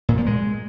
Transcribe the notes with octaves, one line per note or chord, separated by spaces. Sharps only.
A#2
F3
G#3